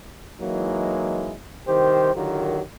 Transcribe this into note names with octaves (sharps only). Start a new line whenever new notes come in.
E3 F#3 G#3 A#3 D#4 E4
C2 D#3 G4 C5
D3 D#3 F#3 F4 G4 A#4